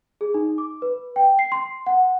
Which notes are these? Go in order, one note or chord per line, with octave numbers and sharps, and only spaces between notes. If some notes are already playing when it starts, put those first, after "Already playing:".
G#4
D#4
D6
B4
G5
C7
C6
F#5